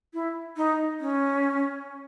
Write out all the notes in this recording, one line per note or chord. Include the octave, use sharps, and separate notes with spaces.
E4
D#4
C#4